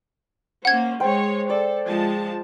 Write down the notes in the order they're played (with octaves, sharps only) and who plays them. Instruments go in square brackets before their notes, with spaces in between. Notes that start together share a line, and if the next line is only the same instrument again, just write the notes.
[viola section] A#3 C#4 C5 [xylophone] F#5 G#6
[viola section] G#3 C#5 [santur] C5 G5
[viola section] A4 [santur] D5
[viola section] F3 G#3 A5